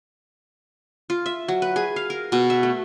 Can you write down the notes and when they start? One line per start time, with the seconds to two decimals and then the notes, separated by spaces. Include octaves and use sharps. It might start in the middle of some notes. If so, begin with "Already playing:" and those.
1.10 F4
1.26 E5
1.48 F#3
1.62 B4
1.76 G#4
1.96 F5
2.10 A#4
2.32 B2
2.50 E5
2.63 A3